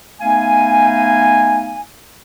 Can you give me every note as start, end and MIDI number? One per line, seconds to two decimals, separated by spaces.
0.21 1.81 57
0.21 1.81 59
0.21 1.81 63
0.21 1.81 77
0.21 1.81 80